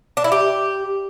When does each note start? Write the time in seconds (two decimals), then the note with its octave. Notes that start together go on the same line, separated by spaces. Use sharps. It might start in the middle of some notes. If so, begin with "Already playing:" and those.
0.17 D4
0.24 E4
0.32 G4